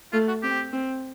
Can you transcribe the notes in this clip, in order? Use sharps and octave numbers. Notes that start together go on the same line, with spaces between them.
A3 F4
F#4
C4 G4
C4